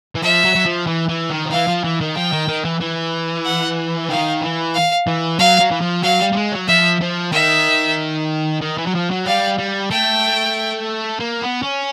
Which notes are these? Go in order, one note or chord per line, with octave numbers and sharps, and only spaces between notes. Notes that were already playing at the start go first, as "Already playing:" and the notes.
E3
F3 E5
F#3
F#3
F3
E3
E3
D#3
F3
E3 F5
F3
E3
D#3
F3 G5
D#3
D#3
E3
E3
F#5
D#3 F5
E3
F5
E3
F#3 F5
F#3
E3
F3
F#3 F5
G3
G3
G#3
F#3
F3 E5
F3
D#3 E5
D#3
E3
F#3
F3
F#3
G3 F5
G3
A3 G5
A#3
B3
C#4